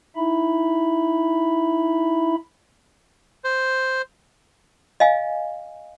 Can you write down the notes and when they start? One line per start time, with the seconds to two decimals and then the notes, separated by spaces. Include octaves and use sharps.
0.16 D#4 E4 E5 B5
3.44 C5
5.00 D#5 F5 G#5